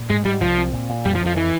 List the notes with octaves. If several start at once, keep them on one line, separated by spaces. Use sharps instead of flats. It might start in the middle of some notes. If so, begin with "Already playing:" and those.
Already playing: A#2
G#2 G#3
G#2 G3
C2 F3
C4
A#2
A#2
F2 G3
F3
F2
F3
E3